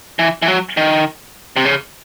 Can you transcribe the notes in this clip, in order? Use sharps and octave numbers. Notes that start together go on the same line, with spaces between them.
E3
E3
F#3
D#3
C3
C#3